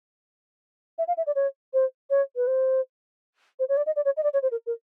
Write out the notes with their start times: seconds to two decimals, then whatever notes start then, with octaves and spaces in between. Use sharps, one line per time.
0.98 E5
1.08 F5
1.17 E5
1.27 D5
1.36 C#5
1.74 C5
2.10 C#5
2.36 B4
2.47 C5
3.59 C5
3.69 C#5
3.77 D5
3.86 D#5
3.96 D5
4.05 C#5
4.17 D#5
4.23 D5
4.33 C#5
4.42 C5
4.51 A#4
4.66 A#4